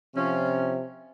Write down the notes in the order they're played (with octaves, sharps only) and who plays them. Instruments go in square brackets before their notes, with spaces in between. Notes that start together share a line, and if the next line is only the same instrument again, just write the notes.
[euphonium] C3 [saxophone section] F3 C#4